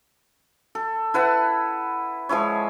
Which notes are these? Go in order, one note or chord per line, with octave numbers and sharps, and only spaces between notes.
A4
E4 B4 F#5 A5
F3 G#3 E4 C#5